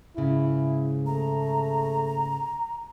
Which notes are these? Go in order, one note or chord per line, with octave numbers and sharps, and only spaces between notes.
G#2 C#3 E4
A3 A#5